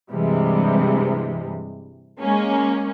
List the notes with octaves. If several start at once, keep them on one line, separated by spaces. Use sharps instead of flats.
G2 C3 E3 G3 G#3
G#3 A#3 C#4